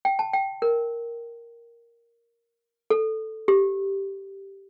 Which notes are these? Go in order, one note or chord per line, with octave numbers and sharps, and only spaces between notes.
G5
A5
G5
A#4
A4
G4